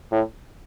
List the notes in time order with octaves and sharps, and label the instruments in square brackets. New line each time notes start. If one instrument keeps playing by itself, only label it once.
[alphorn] A2